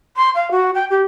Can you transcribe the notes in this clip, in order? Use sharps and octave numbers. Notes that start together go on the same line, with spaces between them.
C6
F5
F#4
G5
G4